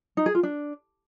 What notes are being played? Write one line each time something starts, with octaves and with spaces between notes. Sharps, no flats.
D#4
G#4
F4
D4